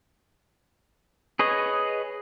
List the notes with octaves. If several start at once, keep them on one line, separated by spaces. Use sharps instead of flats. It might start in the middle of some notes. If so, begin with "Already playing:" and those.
G#4 B4 C#5 D#5